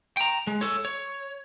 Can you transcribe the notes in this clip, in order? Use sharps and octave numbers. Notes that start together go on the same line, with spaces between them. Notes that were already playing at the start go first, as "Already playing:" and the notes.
G5 A#5
G#3
A4 C#5
C#5